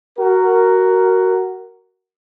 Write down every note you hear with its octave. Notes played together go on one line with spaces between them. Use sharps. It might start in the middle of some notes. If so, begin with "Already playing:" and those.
F#4 A#4